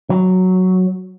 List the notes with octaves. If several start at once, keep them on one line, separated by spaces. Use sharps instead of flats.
F#3